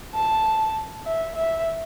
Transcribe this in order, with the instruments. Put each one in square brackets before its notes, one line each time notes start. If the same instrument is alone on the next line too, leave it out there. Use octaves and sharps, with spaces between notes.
[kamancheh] A5
E5
E5